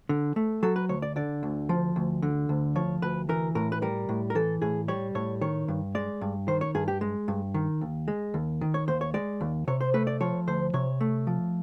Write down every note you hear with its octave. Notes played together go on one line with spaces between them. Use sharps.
D3
A3
F#3 A4
B4
D2 C#5
D5
D3 D5
D2
F3
D2
D3
D2
F3 C#5
D2 B4
E3 A#4
A2 A#4
B4
G3 A#4
A2
A#4
E3 A4
A2 G#4
G3 C#5
A2 C#5
D#3 C#5
G2
G#3 D5
G2
D#3 C5
C#5
G2 G#4
G4
G#3
G2
D#3
D#2
G#3
D#2
D#3
C#5
D#2 C5
C#5
G#3 D5
D#2
C3 C#5
C5
A3 B4
D5
F3 C#5
D2 C5
C3 C#5
A3
F3